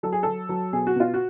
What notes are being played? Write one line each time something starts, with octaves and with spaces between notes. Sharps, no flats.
F#3 A4
G#4
F#3 A4
F#3
B2 G#4
F#4
B2 F4
F#4